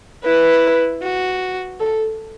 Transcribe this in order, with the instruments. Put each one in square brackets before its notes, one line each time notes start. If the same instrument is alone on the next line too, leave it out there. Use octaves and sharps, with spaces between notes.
[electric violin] E4 [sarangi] B4
[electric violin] F#4
[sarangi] A4